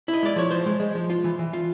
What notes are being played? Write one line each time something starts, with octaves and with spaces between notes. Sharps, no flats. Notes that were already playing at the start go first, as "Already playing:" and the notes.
E4
D#5
G#3 D5
F3 C#5
F3 C5
G#3
G#3
F3
F4
E3
E3
F4